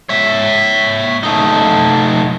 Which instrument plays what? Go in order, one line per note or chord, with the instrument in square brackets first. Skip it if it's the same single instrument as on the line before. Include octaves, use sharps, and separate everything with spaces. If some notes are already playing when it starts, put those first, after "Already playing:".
[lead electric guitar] C#5 E5
A3 D#4